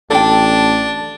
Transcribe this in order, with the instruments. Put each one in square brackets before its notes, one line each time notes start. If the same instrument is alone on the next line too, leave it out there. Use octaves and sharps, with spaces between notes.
[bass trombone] A1 [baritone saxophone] D4 [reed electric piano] A4 A5 [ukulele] D5 G5